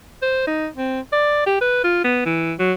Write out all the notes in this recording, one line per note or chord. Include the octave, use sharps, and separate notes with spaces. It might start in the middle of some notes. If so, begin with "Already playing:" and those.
C5
D#4
C4
D5
G4
B4
F4
B3
E3
F#3